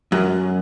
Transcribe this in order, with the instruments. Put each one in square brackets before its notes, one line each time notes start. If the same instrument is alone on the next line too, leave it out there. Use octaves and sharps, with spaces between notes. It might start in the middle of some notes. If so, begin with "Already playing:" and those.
[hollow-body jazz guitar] F#2